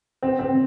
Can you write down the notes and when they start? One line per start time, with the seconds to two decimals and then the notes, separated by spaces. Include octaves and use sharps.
0.23 C4
0.39 C4